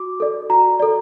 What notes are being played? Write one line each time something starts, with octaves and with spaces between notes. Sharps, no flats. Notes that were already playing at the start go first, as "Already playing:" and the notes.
Already playing: F#4 D6
A4 D5
F#4 A#5
A4 D5